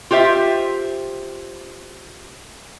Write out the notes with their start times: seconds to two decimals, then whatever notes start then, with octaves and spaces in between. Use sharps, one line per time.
0.11 F4 G4 C5 E5